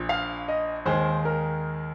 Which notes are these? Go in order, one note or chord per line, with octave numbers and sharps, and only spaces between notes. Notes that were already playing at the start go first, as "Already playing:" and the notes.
Already playing: A#1 A#2 F3
F5
D#5
D#2 D#3 G#3 C5
A#4